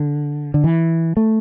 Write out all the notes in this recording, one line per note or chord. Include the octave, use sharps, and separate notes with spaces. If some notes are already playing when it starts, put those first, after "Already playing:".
Already playing: D3
D3
E3
A3